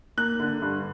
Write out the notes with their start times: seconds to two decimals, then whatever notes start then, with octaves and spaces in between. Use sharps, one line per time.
0.17 A#3 F#6
0.40 D3
0.62 G2